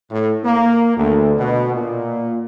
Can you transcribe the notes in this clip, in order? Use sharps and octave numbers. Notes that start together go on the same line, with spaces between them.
A2
A#3
D2
B2
A#2